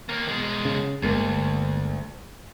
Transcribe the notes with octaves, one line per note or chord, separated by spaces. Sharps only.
D#2 A#3
B2 G#3
C#3
G1 D2 G#3 A#3